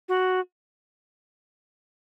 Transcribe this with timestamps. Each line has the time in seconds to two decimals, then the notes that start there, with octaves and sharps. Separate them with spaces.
0.09 F#4